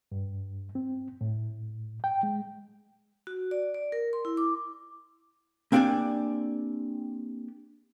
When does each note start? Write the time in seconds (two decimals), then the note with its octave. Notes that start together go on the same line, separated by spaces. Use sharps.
0.12 G2
0.75 C4
1.21 A2
2.04 G5
2.23 G#3
3.27 F#4
3.51 D5
3.74 D5
3.92 A#4
4.13 C6
4.25 E4
4.37 D6
5.72 A#3 C4 D4 G4 D5 G#5